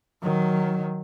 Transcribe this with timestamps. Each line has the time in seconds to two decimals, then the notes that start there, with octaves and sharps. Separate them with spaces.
0.23 D#3 F#3